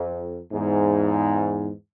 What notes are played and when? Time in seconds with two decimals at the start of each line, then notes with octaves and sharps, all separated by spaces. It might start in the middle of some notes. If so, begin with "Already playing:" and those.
Already playing: F2
0.52 E2 G#2